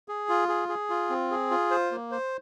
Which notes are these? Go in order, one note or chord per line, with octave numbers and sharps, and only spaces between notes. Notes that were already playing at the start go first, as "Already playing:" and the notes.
G#4
F4
G#4
G#4
F4
C4
G#4
F4
C5
A#3
C5